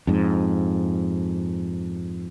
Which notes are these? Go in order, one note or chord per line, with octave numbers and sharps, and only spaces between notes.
F2 G#2